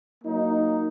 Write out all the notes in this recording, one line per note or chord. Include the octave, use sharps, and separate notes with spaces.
F#3 A#3 D#4